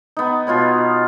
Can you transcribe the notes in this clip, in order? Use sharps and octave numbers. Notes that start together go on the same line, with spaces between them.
B3 D#4
B2 F4 C#5 B5